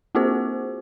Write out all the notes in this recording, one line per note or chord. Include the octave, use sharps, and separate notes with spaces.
A#3 C4 F4 F#4 G#4 C5